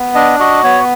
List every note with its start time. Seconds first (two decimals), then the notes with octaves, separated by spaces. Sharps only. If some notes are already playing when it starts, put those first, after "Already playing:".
Already playing: B3
0.15 D4 D#5
0.40 F#4 D#5
0.64 B3 C#5